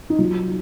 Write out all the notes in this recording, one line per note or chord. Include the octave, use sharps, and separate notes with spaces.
D#4
F#3 F4